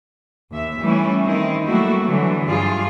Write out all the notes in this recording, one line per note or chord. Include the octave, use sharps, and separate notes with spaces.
D#2 E5
E3 G3 A3 C#4 E4
D#3 C4 D#4 E4
F#3 G3 A3 A#3 E4 F#4
D3 E3 F#3
G2 G3 F4 G#4